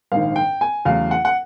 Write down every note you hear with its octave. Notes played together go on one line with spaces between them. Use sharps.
A#1 G#2 D#3 F5
G5
G#5
E2 C#3 F#3 A3 F5
F#5
F#5